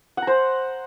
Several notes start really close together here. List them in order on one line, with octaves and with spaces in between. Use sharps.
F#5 A#5 C5